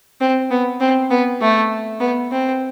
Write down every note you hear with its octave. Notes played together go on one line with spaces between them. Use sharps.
C4
B3
C4
B3
A3
B3
C4